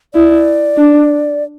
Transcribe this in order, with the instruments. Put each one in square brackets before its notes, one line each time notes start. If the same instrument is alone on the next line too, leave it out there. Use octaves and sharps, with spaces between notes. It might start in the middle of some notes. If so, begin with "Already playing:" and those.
[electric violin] E4 [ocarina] D5
[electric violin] D4